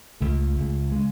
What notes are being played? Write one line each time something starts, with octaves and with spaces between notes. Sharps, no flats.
C#2 C#3 A3
C#2 C#3
C#3 G#3